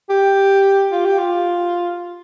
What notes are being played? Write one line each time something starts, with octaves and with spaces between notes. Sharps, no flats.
G4
F4
G4
F4